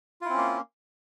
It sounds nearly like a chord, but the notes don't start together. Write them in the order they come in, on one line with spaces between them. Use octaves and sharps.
F4 E4 C4 C#4 A#3